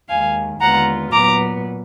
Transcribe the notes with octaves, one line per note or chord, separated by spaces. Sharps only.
D#2 D#3 G#3 F5 G#5
D#2 D3 G#3 B3 F4 F#5 A#5
A#2 F#3 B3 A#5 D6